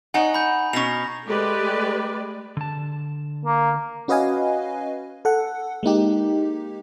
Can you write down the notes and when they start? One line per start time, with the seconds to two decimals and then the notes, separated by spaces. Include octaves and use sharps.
0.14 D#4 C#5 F#5 G#5 A#5
0.34 B5 G6
0.73 B2 C#4 C#6 A#6 F7
1.26 G#3 A3 G4 B4 D5
2.57 D3 A5
3.45 A#3
4.08 C#4 F#4 B4 D#5 F5 G#5
5.25 A4 F#5
5.83 G#3 A#3 D#4 G4